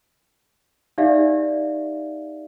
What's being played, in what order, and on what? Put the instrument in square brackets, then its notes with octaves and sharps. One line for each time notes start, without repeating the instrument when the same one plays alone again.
[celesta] D#4 G4 D5 E5 F5